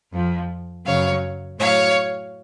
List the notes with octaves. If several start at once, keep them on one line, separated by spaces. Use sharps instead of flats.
F2 F3
F#2 C#3 F#3 C#5 F5
A2 F#3 C#5 F5